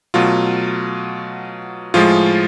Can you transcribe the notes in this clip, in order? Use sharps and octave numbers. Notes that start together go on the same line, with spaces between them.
B2 F#3 A3 F4
A2 F3 G#3 F4